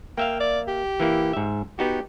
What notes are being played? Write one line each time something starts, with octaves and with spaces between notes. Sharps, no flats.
A#3 E5 F5 G5
D5
G4
E3 A#3 E4
G#2 E5
B3 D#4 F#4 G4